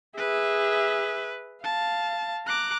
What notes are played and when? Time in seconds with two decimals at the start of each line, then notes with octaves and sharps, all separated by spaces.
0.17 G#4 B4 E5
1.64 F5 A5
2.47 A#5 D6 F#6